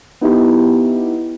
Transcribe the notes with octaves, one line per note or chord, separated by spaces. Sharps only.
B3 D#4 E4 G4